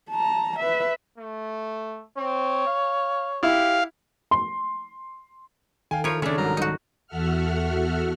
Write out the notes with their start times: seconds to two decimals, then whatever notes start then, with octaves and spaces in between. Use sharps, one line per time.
0.10 A5 A#5
0.60 B4 E5
1.18 A3
2.17 C4 C#5
2.66 F5
3.43 E4 G4 F5
4.31 C6
5.91 D#3 A4 F5 G5 G#5
6.04 F3 E4 A#4 C#5
6.22 C#3 A3 C#4 D4 D5
6.38 C2 G#2 F#3 A#4
6.57 D#4 F#4
7.07 E2 F#4 A4 E5 F#5 F6